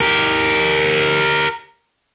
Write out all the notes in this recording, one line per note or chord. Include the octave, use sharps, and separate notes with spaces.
G4 A#4